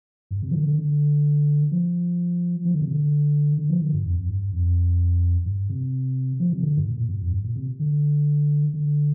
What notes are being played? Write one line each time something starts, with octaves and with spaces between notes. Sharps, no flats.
G2
C3
F3
D3
D3
D3
F3
F3
D3
C3
D3
D3
F3
D3
G2
F2
F2
G2
F2
G2
C3
F3
C3
D3
G2
A#2
A#2
G2
F2
G2
A#2
C3
D3
D3